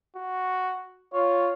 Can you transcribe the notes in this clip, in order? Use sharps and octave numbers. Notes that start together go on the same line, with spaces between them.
F#4
F4 C#5